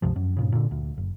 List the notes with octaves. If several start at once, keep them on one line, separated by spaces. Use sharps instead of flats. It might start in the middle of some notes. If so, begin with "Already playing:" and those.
C#2 G2 C3 F3
F#2
G2 A#2 C#3
A#2 D3
D2
F#1